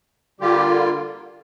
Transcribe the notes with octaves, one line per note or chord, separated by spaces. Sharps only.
D3 G3 A#3 F4 G4